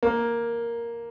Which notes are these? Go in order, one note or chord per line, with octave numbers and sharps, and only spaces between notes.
A#3